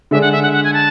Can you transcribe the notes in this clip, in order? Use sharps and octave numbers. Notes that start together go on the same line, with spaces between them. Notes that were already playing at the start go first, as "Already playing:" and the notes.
D3 G#3 D4 E5
F#5
E5
F#5
F#5
G#5
A5